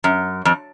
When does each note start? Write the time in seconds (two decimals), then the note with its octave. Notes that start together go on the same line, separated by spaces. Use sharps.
0.04 F#2
0.45 F2